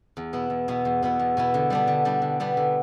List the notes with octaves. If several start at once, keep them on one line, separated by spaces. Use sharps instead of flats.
E2
B2 B3 E4
E2
B2 B3 E4
E2
B2 B3 E4
E2
B2 B3 E4
D3
G3 B3 D4
D3
G3 B3 D4
D3
G3 B3 D4
D3